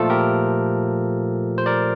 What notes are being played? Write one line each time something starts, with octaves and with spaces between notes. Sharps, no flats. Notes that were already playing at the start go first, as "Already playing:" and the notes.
Already playing: A#2 F3 A3 F4 A4
G4 A#4
C5
A#4 D5